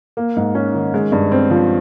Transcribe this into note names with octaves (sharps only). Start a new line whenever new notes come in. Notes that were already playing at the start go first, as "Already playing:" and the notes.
A#3
G#2
C#4
D#3
G#3
G2
C4
F3